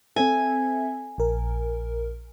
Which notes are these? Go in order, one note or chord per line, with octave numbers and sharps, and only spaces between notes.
C4 A4 E5 G#5
A#1 A#4